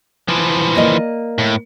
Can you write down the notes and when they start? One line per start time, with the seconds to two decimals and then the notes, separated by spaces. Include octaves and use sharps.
0.28 E3 F3
0.75 A#3 D5 D#5
1.38 A2